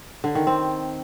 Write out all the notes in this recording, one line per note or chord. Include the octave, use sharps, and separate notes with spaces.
D3
D#3
C4